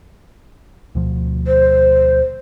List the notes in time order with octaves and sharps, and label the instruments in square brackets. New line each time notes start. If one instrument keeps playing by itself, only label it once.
[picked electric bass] D2 B2 F3
[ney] C5